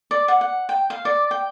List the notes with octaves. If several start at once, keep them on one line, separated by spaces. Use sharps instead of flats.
D5
F#5
F#5
G5
F5
D5
G5